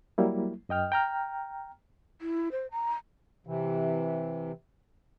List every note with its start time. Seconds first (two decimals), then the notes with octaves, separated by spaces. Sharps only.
0.18 F#3 G3 A#3 E4
0.69 F#2 D#5 G5 F6
0.92 G5 A#5 F6
2.21 E4
2.51 C5
2.71 A#5
3.47 C3 E3